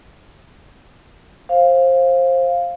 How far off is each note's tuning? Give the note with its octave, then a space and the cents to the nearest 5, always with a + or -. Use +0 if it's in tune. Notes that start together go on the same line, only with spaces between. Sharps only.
C5 +20 F5 +0